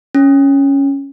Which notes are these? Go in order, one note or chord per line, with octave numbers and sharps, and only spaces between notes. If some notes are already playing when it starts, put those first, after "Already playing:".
C#4